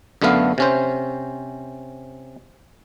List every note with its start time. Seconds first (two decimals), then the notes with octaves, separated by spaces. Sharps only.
0.22 F#2 D3 A3 B3 F5
0.58 C3 C#4 C5